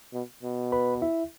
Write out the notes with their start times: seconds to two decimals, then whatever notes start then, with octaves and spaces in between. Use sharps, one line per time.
0.13 B2
0.43 B2
0.72 B4 B5
1.02 E4 E5